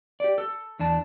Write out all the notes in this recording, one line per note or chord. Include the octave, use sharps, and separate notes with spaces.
G4 D5
A4
E2 D4 A5